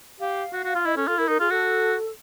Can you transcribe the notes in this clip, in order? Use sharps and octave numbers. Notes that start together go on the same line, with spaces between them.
G4 F5
F#4
F#4
F4
E4 D#5
C#4 A4
F4 A4
E4 A#4
D#4 A#4
F4 G#4
F#4 A4